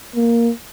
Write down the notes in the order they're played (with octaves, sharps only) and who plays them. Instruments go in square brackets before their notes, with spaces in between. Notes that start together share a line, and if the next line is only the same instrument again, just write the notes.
[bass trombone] A#3